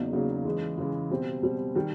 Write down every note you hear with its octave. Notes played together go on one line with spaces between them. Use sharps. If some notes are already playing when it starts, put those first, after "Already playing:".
Already playing: E2 C#3 F#3 A#3 D#4
E2 C#3 F#3 A#3 D#4
C#3 E3 G#3
C#3 E3 G#3
B2 G3 C4
B2 G3 C4
D#3 G3